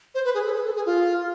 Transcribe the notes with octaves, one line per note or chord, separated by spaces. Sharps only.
C5
B4
G#4
A4
B4
A4
G#4
F4